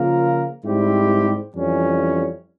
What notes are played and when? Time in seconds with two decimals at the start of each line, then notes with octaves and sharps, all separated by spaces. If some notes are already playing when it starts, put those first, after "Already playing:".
Already playing: C#3 F3 A#3 F4 A#4
0.63 G#2 G3 C4 E4 G4
1.55 F2 E3 G3 C#4